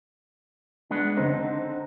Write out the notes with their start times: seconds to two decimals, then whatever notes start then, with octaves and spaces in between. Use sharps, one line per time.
0.91 G#3 B3 D4
1.17 D3 C4 D#4